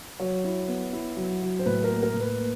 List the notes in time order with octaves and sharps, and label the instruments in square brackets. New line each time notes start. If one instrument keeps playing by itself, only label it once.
[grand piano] F#3 C#5
E4
B3
E4
F#3
F#3
C5
A2 B4
A#4
A#3
A#4
A2
B4
A#3